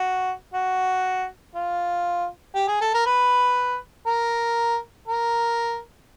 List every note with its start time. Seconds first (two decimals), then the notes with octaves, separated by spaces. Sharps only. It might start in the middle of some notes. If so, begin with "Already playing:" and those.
Already playing: F#4
0.54 F#4
1.55 F4
2.55 G4
2.68 G#4
2.81 A4
2.94 A#4
3.06 B4
4.07 A#4
5.08 A#4